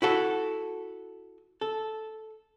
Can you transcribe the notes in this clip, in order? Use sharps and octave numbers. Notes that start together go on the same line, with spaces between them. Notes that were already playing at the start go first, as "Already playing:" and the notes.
E4 F#4 A4
A4